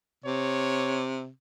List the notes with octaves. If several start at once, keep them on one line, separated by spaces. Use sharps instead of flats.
C3 C#5